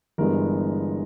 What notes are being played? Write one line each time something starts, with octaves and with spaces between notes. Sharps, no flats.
G1 G2 E3 G#3 B3 A#4